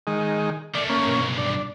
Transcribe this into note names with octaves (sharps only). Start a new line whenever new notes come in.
D#3 G#3
D#3 A3 D5
A#3 C#4
B1 G2
D4